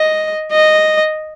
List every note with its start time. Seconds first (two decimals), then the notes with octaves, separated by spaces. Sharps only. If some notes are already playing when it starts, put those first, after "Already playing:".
Already playing: D#5
0.52 D#5